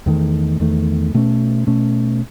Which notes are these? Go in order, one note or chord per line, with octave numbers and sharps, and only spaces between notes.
E2 D#3 A3
E2 D#3 A3
B2 A3 C#4
B2 A3 C#4